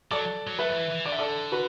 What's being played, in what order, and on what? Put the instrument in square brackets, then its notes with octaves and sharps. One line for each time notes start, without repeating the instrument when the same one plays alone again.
[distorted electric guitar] F#3 [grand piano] A4 D5
[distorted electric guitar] F#3
[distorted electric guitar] A3 [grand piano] B4 E5
[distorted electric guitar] F#3
E3
E3
[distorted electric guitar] D3 [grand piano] D5
[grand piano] E5
A4 D5
F#4 B4